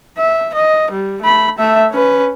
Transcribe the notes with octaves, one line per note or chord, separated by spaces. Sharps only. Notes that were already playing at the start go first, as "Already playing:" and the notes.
E5
D#5
G3
A3 B5
A3 E5
C#4 B4